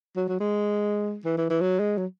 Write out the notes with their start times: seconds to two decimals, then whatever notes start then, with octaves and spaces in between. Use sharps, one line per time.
0.17 F#3
0.28 F#3
0.40 G#3
1.25 E3
1.38 E3
1.50 E3
1.61 F#3
1.80 G#3
1.98 F#3